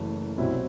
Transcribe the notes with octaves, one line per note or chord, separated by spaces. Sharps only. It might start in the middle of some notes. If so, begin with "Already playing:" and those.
Already playing: F#1 F#2 E3 A3
C2 B2 F#3 C4 E4